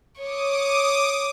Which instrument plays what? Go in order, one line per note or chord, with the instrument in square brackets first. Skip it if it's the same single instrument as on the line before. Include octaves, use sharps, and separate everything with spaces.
[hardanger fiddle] C#5 [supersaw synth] D6 D#6